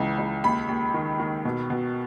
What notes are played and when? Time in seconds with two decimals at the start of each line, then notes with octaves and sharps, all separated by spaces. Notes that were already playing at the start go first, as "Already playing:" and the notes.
Already playing: C#2 C#3 E3
0.18 C#2
0.44 D#2 B5
0.69 D#2
0.94 D#3
1.20 D#3
1.45 B2
1.70 B2